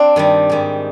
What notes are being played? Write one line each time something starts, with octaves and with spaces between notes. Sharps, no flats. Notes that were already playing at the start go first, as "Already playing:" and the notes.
Already playing: C4 D4
G2 D#3 G3
G#2 D#3 G3